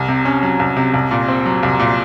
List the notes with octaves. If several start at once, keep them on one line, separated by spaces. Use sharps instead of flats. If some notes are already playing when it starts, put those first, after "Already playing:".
Already playing: C2
C3
C#4
F#3
C2
C3
C2
A#2
C4
F#3
C2
A#2